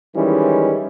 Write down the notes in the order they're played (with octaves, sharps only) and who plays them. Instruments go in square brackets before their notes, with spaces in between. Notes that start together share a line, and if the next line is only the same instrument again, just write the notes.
[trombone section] D#3 E3 G3 G#3 C#4 E4